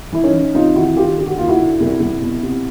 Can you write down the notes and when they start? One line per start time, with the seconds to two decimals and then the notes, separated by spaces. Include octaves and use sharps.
0.13 E3 E4
0.24 C#4 D#4
0.34 E3
0.54 C3 D#4 F4
0.76 D#3 E4 F#4
0.96 D#3 F4 G4
1.18 D3 G4
1.27 F#4
1.38 D#2 F4
1.48 E4 F#4
1.59 D3
1.80 C2
2.00 C2
2.22 B2
2.43 C3